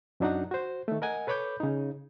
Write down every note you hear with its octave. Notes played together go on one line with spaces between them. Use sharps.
F#2 F#3 D4 D#4 F#4 F#5
F#4 C5
D#3 A3
A#4 D#5 F#5 G#5
A4 B4 C#5 B5 D6 G6
C#3 D#4